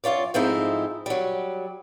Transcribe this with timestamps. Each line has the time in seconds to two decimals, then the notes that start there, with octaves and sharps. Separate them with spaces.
0.04 F#2 F4 C#5 D5
0.34 G#2 F3 A3 C4 D#4 E4
1.06 F#3 G3